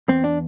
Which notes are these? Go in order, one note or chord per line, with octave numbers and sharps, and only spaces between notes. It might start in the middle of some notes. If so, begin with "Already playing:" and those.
E2 C4
D4